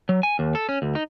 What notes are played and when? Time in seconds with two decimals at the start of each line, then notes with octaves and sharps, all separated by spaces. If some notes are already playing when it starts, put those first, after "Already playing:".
0.09 F#3
0.23 G#5
0.39 D#2
0.55 A4
0.69 C#4
0.82 D2
0.95 D#4